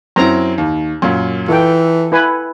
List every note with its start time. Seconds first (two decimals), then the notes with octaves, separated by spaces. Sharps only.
0.16 F#2 C4 E4 A#5
0.58 D#2
1.02 F#2 A#2
1.48 E3 F4 A4 G5
2.12 E4 B4 G#5